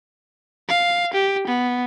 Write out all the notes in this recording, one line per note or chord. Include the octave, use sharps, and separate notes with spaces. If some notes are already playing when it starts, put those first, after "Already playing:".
F5
G4
B3